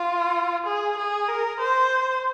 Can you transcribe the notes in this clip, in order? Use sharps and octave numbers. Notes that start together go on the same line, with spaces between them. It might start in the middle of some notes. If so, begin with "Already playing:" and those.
Already playing: F4
G#4
G#4
A#4
C5